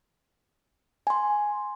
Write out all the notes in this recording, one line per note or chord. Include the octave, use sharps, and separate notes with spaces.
G#5 C6